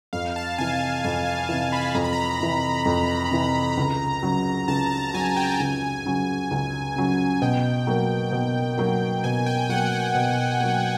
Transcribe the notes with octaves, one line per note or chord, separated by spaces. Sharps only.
F2 F5
A5
C3 E3 G#5
A5
F2 G#5
G#5
C3 E3 A5
B5
F2 A#5
B5
A#5
C3 E3
F2
C3 E3
C#2
C#3 F#3
C#2 A5
A5
C#3 F#3 G#5
G5
C#2 G#5
C#3 F#3
C#2
C#3 F#3
B2 G5
F#3 A#3
B2
F#3 A#3
B2 G#5
G5
F#3 A#3 F#5
F#5
B2
F#3 A#3